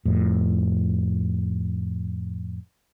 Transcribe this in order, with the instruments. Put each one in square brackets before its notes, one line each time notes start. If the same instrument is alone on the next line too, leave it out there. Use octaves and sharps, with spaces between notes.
[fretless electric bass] F2 A2